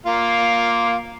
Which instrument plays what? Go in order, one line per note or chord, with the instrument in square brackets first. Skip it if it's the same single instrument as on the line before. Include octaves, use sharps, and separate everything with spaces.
[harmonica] A#3 F4